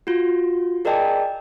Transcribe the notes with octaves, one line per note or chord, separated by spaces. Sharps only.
F4 F#4
G#4 A#4 D5 D#5 G5 A5